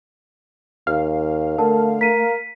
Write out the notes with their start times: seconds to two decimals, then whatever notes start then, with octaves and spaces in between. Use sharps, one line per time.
0.87 D#2 F5
1.58 D3 A3 A#4 A5
2.01 A#4 B6 D#7